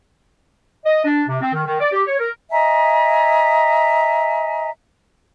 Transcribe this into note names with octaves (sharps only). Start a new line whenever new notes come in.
D#5
D4
C3
C4
D#3
D#3
D5
G4
C#5
A#4
D#5 E5 G#5 A#5